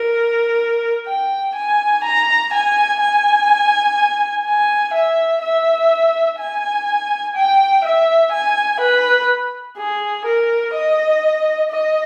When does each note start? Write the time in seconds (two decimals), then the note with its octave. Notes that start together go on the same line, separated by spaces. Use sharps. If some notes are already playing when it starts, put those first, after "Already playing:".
Already playing: A#4
1.07 G5
1.55 G#5
2.04 A#5
2.53 G#5
3.01 G#5
4.45 G#5
4.93 E5
5.42 E5
6.40 G#5
7.36 G5
7.85 E5
8.32 G#5
8.80 B4
9.78 G#4
10.25 A#4
10.75 D#5
11.71 D#5